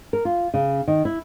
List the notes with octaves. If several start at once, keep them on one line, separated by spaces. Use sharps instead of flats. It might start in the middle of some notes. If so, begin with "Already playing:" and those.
A#4
F4
C#3
D#3
E4